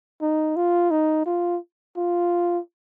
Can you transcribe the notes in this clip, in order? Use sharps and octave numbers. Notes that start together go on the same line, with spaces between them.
D#4
F4
D#4
F4
F4